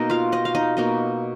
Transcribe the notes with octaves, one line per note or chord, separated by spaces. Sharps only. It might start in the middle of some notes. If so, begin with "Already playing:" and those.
Already playing: B2 A#3 D#4 D#5
F4 F5
D#4 D#5
F5
D#4 D#5
B2 A#3 D#4 D#5